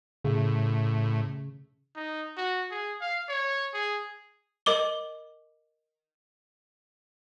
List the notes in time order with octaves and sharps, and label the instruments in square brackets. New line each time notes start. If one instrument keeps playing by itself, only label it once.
[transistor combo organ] A2 [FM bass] C#3
[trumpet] D#4
F#4
G#4
F5
C#5
G#4
[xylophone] A#4 D#5 D6 G7